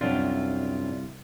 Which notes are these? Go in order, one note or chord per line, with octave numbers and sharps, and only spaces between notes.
C2 F#2 C4 D4 F4